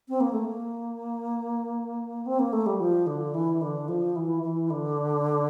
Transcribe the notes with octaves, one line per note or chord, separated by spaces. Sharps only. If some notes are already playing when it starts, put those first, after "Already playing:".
C4
A#3
A3
A#3
C4
A#3
A3
G3
F3
D3
E3
D3
F3
E3
E3
D3